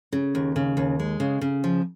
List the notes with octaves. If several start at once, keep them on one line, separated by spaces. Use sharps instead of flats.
C#3
D#2
C#3
D#2
G#3
C#3
C#3
F3